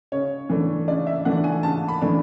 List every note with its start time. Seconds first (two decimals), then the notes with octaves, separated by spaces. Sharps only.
0.12 C#3 C#5
0.49 E3 A3 D4
0.87 C#3 D5
1.07 E5
1.25 E3 A3 D4 F#5
1.44 G#5
1.63 C#3 A5
1.88 B5
2.02 E3 A3 D4